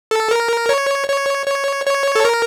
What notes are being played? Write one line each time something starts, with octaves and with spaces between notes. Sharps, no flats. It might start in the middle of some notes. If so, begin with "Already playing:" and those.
A4
A#4
C#5
C#5
C#5
C#5
A4
A#4